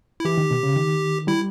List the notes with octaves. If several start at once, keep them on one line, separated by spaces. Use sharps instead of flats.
E4
E3 G4
D#3
B2
C#3
D#3
G3 E4